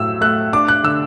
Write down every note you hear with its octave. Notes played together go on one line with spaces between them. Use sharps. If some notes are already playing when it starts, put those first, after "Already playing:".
Already playing: A2 F#3 E6
A3 F#6
D4 D6
F#6
D3 E6